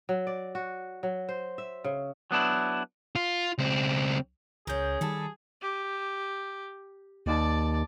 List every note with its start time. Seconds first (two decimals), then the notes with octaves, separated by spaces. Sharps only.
0.09 F#3
0.27 D5
0.55 F#4
1.03 F#3
1.29 C5
1.58 E5
1.84 C#3
2.31 F#3 B3 D4 E4
3.15 F4
3.58 C#2 C4
4.67 C#2 C#4 G#4 A#4 G6
5.01 D#3 G3 A4 A5
5.62 G4
7.26 D#2 D5 A5